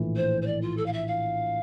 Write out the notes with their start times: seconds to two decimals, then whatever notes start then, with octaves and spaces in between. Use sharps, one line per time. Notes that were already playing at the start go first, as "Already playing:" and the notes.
Already playing: A#1 A2 E3
0.16 C5
0.41 C5
0.46 D5
0.61 F4
0.77 A4
0.85 F5
0.92 E5
1.07 F5